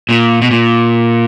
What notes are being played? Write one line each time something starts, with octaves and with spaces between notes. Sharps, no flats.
A#2
B2
A#2